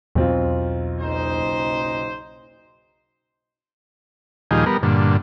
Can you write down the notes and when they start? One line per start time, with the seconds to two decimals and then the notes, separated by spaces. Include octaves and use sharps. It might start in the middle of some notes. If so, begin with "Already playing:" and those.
0.15 B1 E2 C4 F4
1.00 F#1 D#4 C5
4.51 D#2 A#2 F3 G3 D#4 G#4
4.66 G3 B3 A#4
4.83 G2 A#2 D3